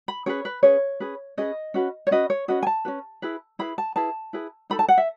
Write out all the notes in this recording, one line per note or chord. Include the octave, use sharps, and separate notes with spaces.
B5
C#4 G#4 B4 C#5
B4
C#4 G#4 B4 C#5
C#4 G#4 B4
C#4 G#4 B4 D#5
C#4 F#4 B4
C#5
C#4 F#4 B4 D#5
C#5
C#4 F#4 B4 D#5
G#5
A5
C#4 F#4 B4
E4 G#4 B4
E4 G#4 B4 B5
A5
E4 G#4 B4 A5
E4 G#4 B4
D#4 A4 B5
A5
F#5
E5